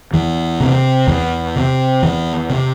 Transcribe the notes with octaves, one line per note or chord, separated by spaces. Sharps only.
E2 E3
C3
E2
C3
E2 E3
C3